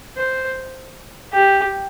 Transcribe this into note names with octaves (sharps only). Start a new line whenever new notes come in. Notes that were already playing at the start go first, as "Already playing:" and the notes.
C5
G4